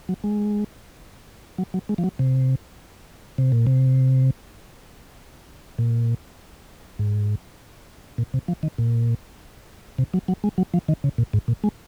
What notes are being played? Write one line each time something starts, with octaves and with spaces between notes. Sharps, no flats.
F#3
G#3
F#3
F#3
G#3
F3
F#3
C3
C3
A#2
C3
A#2
G#2
A#2
C3
F3
D#3
A#2
C3
F#3
F#3
G#3
F#3
F3
D#3
C#3
A#2
G#2
A#2
G#3